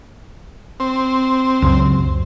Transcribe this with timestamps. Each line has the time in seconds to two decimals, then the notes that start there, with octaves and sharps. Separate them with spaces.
0.80 C4
1.62 C#2 F#2